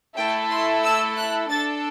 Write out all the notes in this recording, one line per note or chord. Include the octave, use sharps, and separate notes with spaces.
A3 E4 A4 G5
C6
E6
F#6
D4 A4 A6